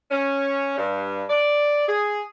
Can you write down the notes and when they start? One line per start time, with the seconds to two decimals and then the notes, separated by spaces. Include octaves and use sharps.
0.11 C#4
0.78 G2
1.30 D5
1.88 G#4